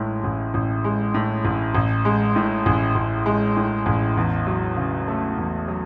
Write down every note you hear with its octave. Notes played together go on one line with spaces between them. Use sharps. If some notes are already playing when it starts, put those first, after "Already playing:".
Already playing: A1 A2 G#3
A1
A1
G#3
A2
A1
A1
G#3
A2
A1
A1
G#3
A2
A1
E2
F#3
C#3
A3
E2
F#3